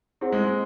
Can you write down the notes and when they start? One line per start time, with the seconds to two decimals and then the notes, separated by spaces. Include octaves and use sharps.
0.21 C4 E4 G#4 C5 F#5
0.32 G#3
0.44 G#3